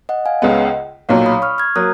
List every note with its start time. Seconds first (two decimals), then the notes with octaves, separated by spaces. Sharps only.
0.09 D#5 F#5
0.26 F5 G#5
0.42 C#2 C#3 G#3 B3 D#5 F#5
1.09 B1 A#2 F#3 C#5 F5
1.26 B5 D#6
1.42 C#6 F6
1.58 F6 G#6
1.76 F#3 A#3 D#6 F#6